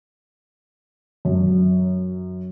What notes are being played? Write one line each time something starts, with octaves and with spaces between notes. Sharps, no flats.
F#2